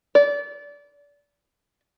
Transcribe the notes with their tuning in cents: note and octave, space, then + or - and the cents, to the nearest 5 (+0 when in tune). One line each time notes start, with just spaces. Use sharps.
D5 -25